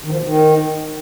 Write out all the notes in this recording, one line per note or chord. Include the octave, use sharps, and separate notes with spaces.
D#3
F3
B2
D#3